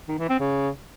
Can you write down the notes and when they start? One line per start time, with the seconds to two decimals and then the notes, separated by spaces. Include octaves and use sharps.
0.08 D#3
0.19 E3
0.29 C4
0.40 C#3